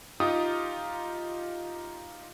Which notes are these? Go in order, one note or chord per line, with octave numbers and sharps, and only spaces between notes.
D#4 F4 G4 D#6